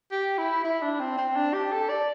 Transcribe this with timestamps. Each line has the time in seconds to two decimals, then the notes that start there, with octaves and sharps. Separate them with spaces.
0.12 G4
0.38 E4
0.64 E4
0.82 D4
1.00 C4
1.18 C4
1.36 D4
1.54 G4
1.72 A4
1.90 D5